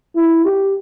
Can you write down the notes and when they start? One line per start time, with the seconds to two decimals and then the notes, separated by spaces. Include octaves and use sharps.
0.15 E4
0.44 G4